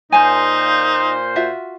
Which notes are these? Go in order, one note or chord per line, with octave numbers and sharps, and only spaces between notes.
A#2 D#4 C5 G#5 A5
F4 F#4 E5